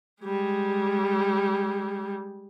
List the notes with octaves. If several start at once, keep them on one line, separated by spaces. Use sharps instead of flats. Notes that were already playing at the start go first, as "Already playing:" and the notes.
G3 G#3